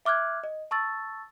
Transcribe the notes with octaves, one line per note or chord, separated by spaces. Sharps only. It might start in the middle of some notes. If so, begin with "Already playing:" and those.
E5 D6 F6 F#6 G#6
D#5
A5 C#6 E6 A6